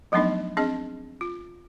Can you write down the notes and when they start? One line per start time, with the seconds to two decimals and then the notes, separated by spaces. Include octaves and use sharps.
0.12 F3 F#3 A3 B3 D4 D#4
0.57 C4 D4 G#4 D#5
1.21 F4